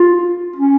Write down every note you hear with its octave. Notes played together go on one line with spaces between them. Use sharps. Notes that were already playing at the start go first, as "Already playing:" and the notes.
Already playing: F4
C#4